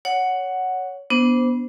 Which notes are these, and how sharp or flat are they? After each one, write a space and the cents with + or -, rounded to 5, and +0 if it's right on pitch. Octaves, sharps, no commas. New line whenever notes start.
C#5 +15 F#5 +0
B3 -15 D4 -15 C5 -15